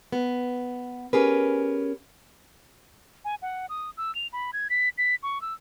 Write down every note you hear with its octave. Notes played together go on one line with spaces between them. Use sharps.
B3
C#4 G4 G#4 A#4 B4
G#5
F#5
D#6
E6
F7
B5
G#6
B6
B6
C#6
E6